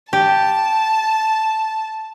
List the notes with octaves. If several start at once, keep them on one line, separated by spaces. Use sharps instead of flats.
G4 A5